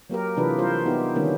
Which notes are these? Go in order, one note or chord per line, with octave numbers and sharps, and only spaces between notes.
F#3 A#3 G4 A#4
C3 E3 D4 F4 G#4 B4
G3 F4 A#4 C5
B3 D#4 E4 G4
D3 D#3 G3 A#3 C#4